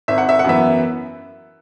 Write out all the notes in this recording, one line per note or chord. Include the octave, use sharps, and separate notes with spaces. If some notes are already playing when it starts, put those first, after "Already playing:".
G#1 E5
F#5
E5
F#5
F#2 E3 B3 E5